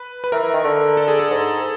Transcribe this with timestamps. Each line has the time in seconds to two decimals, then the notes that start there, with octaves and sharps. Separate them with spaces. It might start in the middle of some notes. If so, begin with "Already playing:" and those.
Already playing: B4
0.24 B4
0.32 E3 A#4
0.43 E3
0.54 D#3
0.64 D3
0.97 A4
1.08 G#4
1.19 A4
1.30 G#2